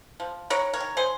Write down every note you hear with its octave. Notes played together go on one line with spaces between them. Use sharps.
F3
D#3 A#4 C#5
A#4 C#5
D#3
G#4 C5